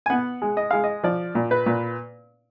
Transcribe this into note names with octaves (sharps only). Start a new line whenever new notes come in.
G#5
B3 F#5
G#3
D#5
G#3 F5
D#5
F3 D5
A#2
B4
A#2